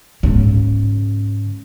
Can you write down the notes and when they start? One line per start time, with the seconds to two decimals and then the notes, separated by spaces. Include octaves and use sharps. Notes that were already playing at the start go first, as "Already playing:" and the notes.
0.23 G#2 C#3